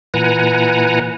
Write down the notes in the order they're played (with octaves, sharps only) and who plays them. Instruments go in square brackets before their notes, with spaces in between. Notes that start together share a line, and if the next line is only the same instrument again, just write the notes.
[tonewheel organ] A#2 E3 B4 F#5 G#5 A#5